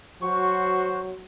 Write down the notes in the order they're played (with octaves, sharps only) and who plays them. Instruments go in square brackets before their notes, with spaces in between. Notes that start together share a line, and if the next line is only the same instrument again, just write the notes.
[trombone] F#3 [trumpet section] F#4 C5 [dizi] C#6